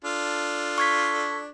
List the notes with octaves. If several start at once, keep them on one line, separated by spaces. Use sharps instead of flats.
D4 F4 A4
C#6 G#6 B6